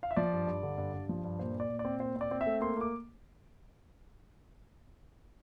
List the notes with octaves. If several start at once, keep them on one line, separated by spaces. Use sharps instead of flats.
F5
E5
F3 D5
G2
G2
D3
G2
G2
F3
G2
A#2 C5
A#2
D5
A#2
D5
C4
A#2 C5
C4
D5
C4
E5
A3
A#3 C6
A#3 D6